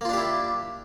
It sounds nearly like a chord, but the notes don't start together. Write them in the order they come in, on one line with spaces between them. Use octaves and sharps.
A#3 F4 D4 G4 E4